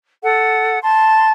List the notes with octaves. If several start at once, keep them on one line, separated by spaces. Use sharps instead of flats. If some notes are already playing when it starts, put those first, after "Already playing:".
A4 F#5
A5 C6